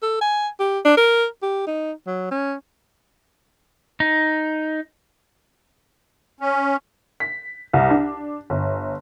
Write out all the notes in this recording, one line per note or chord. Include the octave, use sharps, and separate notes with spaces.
A4
G#5
G4
D4
A#4
G4
D#4
F#3
C#4
D#4
C#4
B6
C2
D4
G1